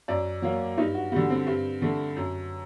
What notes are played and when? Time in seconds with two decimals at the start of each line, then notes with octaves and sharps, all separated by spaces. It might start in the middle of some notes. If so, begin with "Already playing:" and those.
0.08 F#2 D5
0.42 F#3 A#3
0.78 G2 D#4
0.94 F#4
1.12 G3 F#4
1.16 D3
1.30 C4
1.47 G2
1.82 D3 A3
2.17 F#2